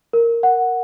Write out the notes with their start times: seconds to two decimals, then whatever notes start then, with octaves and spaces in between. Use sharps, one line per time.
0.13 A#4
0.43 F#5